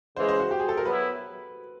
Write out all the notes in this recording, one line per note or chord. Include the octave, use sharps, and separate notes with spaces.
C#3 E3 G#3 C5
C5
F#4
G4
G#4
A4
A#4
F#3 B3 E4 B4